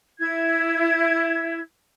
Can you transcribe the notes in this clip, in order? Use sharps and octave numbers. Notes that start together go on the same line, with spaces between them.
E4 G#6